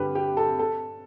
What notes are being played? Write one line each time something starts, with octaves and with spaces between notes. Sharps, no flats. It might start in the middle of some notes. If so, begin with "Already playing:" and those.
Already playing: G2 D3 G4 B4
G4
A4
A4